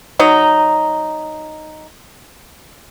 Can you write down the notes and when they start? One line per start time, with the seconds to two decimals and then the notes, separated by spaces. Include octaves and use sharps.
0.19 F#3 D#4